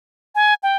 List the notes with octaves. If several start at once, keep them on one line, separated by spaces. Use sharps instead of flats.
G#5
G5